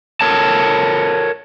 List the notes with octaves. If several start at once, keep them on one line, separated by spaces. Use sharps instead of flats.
A4 A#4 C#5 A5